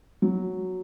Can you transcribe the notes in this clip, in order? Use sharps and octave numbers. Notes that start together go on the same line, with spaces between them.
F#3